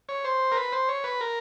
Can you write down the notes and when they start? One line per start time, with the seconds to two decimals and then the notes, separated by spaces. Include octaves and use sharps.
0.09 C#5
0.25 C5
0.52 A#4
0.57 B4
0.72 C5
0.89 C#5
1.04 B4
1.21 A#4